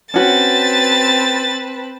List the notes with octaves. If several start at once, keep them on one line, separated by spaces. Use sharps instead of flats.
C4 C#4 F#4 B4 A5 A6